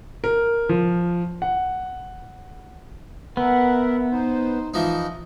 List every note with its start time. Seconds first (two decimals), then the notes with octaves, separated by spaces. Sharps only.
0.24 A#4
0.69 F3
1.42 F#5
3.37 B3 A#4 E5 F#5
4.11 D#4 C5
4.74 E3 F3 D#4 D#5